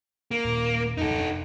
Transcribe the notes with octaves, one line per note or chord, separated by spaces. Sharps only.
A#3
D#1 A#2
D#1 F#2 D#4 A4
F1 D4